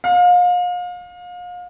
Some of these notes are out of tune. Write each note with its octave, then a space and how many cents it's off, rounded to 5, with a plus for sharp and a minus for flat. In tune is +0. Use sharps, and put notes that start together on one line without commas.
F5 +35